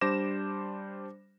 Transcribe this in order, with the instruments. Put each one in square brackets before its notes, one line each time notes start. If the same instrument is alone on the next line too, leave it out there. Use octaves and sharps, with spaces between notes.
[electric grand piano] G3 D4 C5 D6 A#6 E7